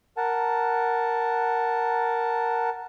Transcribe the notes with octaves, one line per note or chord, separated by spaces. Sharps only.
A#4 F#5 A5